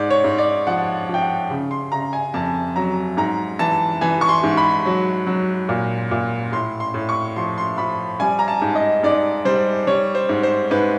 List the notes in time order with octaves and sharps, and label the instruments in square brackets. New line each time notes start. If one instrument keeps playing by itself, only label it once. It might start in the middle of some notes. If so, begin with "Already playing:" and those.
Already playing: [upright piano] G#2 D5
C#5
G#2
D5
F3 F#5
F3
G5
F#5
C#3
C6
C#3 A#5
G#5
F2 A5
F#3 A#5
G#2 A#5
E3 A5
E3 G#5
C#6
C6
G#2
B5
F#3
F#3
A#2
A#2
A2 C6
C6
A2
C#6
F3 C6
C6
F3 B5
G3 G#5
A#5
A5
G#2
D#5
G#2 D5
G3 C5
G3 C#5
C5
G#2
C5
G#2 B4